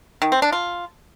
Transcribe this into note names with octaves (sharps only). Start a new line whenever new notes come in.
D#3
C4
D4
F4